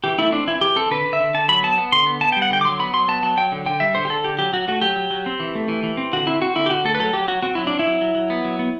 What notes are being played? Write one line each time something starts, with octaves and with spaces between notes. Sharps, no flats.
E3 G4
A3 E4
C4 D4
E3 E4
E3 G4
C4 A4
D3 B4
D3
E5
D3
D3 A5
F#3 B5
B3 A5
B3
D3 C6
B3
B3 A5
G3 G5
F#5
D3 G5
D6
F#3 C6
B3 B5
F#3 C6
B3 A5
F#3 A5
F#3 G5
D3
D3 G5
G3 E5
D3 C5
G4
D3 A4
D3 G4
F#3 G4
F#3 F#4
A3 F#4
F#3 G4
F#3
F#3
C4
E3
A3
E3
E3
C4
D3 F#4
C4 E4
C4 F#4
D3 E4
G4
D3 F#4
A3 A4
B4
F#3 A4
F#3 G4
F#3 F#4
C4 F#4
F#3 E4
D4
C4
E4
F#3
F#3
F#3
B3
F#3
B3